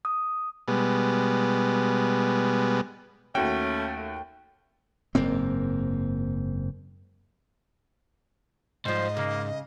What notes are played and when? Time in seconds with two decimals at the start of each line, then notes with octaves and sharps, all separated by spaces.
0.05 D#6
0.68 B2 G3 G#3 B3
3.35 D#2 A3 C#4 F#4 G5
5.15 F#1 G#2 A#3 C4
8.85 G#2 F3 G3 C5 D#5
9.17 C#3 A#3